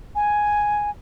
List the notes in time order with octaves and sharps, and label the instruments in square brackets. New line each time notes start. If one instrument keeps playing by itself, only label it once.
[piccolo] G#5